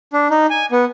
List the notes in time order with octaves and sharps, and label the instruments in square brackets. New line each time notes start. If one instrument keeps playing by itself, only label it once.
[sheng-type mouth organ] D4
D#4
G#5
B3